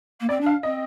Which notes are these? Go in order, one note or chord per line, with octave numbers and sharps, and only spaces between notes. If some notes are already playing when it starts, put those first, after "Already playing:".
A#3
C4 D5
D4
F5
C4 D#5